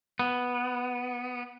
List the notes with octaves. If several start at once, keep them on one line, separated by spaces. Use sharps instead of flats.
B3